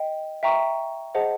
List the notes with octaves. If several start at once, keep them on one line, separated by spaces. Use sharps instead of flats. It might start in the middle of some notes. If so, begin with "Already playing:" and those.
Already playing: D#5 G5
E5 G5 A#5 C#6
G#4 C5 D#5 F#5 A5